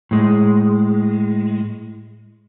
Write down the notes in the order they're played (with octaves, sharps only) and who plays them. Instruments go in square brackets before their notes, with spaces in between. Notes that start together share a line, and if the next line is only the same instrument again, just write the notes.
[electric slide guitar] A2 G#3